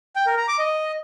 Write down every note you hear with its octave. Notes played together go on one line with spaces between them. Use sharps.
G5
A#4
A#5
D6
D#5